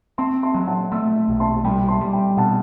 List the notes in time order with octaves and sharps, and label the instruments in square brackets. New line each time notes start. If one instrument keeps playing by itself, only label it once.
[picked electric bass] C4 [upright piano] A5 C6
[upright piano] A5 C6
[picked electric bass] F#3
[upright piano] F#5 A5
[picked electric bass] A3 [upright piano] C6 E6
[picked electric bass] B1
[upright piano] A5 C6
[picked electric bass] G3 [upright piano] G5 B5
[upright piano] A5 C6
[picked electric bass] G3
[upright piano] G5 B5
[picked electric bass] B2 [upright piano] F#5 A5